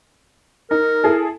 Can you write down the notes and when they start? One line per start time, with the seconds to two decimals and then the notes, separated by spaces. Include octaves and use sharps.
0.71 D#4 A#4
1.04 E4 G#4 A4